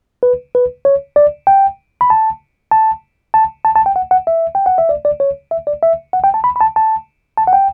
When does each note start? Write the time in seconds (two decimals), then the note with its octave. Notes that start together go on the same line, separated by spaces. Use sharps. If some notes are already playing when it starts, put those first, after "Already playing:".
0.23 B4
0.55 B4
0.85 C#5
1.16 D5
1.47 G5
2.01 B5
2.10 A5
2.72 A5
3.34 A5
3.65 A5
3.76 A5
3.86 G5
3.96 F#5
4.11 F#5
4.27 E5
4.55 G5
4.66 F#5
4.78 E5
4.89 D5
5.05 D5
5.20 C#5
5.51 E5
5.67 D5
5.83 E5
6.13 F#5
6.24 G5
6.34 A5
6.44 B5
6.56 B5
6.61 A5
6.76 A5
7.37 A5
7.47 F#5
7.53 G5